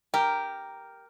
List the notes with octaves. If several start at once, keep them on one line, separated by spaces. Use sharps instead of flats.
G4 A#4